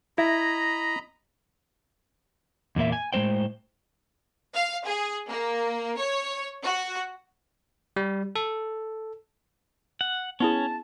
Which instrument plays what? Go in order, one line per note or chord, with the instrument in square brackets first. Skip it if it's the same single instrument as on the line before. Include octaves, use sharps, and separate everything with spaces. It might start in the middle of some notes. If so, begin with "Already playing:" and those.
[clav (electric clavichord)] E4 [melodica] D#5 A#5 B5
[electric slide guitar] E2 A#2 A#3 E5
G#5
A2 G#3 A#3 C5 G5
[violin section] F5
G#4
A#3
C#5
F#4
[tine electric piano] G3
A4
[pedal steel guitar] F#5
[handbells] B3 E4 G#4 [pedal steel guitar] C#4 [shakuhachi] A5